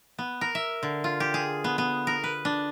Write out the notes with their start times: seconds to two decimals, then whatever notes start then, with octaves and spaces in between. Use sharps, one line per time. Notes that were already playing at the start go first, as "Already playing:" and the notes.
0.18 B3
0.41 A#4
0.55 E5
0.83 D3
1.04 F4
1.20 G4
1.34 G#4
1.64 B3
1.78 B3
2.07 A#4
2.24 B4
2.45 D4